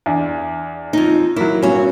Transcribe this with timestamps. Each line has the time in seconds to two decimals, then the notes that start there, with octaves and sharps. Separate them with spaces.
0.06 E2 D4
0.93 F2 D#4
1.36 F#3 A#3 E4
1.62 G2 B3 C#4 F#4